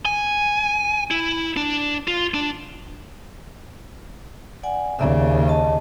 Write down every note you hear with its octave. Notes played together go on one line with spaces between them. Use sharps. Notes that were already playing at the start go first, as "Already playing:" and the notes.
G#5
E4
D4
F4
D4
D5 F#5 G#5
D#2 C#3 D5 E5
D#5 A5